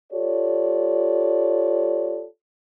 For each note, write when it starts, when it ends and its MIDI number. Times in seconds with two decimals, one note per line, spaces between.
0.13 2.25 65
0.13 2.25 67
0.13 2.25 69
0.13 2.25 73
0.13 2.25 74